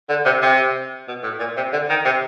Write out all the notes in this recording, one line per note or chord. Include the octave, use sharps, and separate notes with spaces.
D3
C3
C3
B2
A2
A#2
C3
D3
D#3
C3